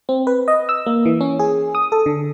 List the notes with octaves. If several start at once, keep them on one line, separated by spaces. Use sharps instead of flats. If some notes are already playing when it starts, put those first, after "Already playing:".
C4
B4
D#5
E6
A#3
E3
C#4
G#4
D#6
A4
D3